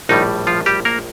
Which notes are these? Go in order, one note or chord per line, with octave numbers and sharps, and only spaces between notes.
A#1 A2 D#3 G3 D#4
F3 F4
G3 G4
A#3 A#4